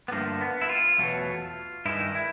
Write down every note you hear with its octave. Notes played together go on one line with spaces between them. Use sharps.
B3
G2 D3 F3 A3 A#3
B3
E4
F4
E2 B2 F#3 A3
G2 D#3 G#3 E4
E4